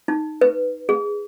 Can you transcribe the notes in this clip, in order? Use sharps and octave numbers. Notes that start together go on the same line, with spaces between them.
D#4
B4
G#4